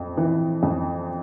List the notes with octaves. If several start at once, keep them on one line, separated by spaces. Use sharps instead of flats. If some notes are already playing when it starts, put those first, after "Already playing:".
Already playing: F2
E3
F2